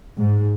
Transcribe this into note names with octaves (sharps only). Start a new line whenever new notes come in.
G#2